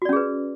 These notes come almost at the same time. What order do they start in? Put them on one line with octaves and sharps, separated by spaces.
F#4 D5 C#4 G#4 B4